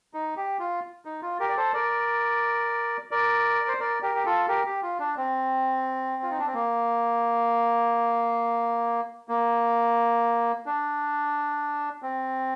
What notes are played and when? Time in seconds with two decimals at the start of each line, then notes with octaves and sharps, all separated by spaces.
0.14 D#4
0.37 G4
0.59 F4
1.05 D#4
1.22 F4
1.40 G4 A#4
1.49 D5
1.57 A4 C5
1.73 A#4 D5
3.11 A#4 D5
3.68 C5
3.80 A#4 D5
4.02 G4 A#4
4.15 G4
4.25 F4 A4
4.48 G4 A#4
4.65 G4
4.83 F4
4.99 D4
5.17 C4
6.23 F4
6.30 D#4
6.38 D4
6.46 C4
6.54 A#3
9.28 A#3
10.66 D4
12.02 C4